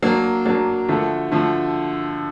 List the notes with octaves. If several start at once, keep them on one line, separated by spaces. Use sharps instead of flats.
F#3 A#3 D4
F#3 A#3 D4
D3 F3 A3
D3 F3 A3